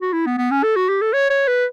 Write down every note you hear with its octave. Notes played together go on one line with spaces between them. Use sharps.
F#4
E4
B3
B3
C#4
A4
F#4
G4
A4
C#5
C#5
B4